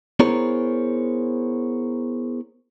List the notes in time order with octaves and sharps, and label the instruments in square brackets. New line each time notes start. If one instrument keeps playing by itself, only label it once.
[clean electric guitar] B3 E4 G#4 A#4 C5 C#5